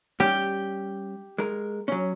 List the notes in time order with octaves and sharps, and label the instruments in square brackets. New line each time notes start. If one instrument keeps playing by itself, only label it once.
[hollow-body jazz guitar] G3 C#4 [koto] G4
[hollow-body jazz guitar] G#3 A#4
F#3 C#4